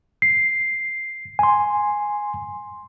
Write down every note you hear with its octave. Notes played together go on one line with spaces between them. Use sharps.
C7
G#5 C6